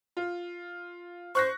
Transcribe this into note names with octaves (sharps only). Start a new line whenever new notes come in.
F4
C5 C#6 F#6 A#6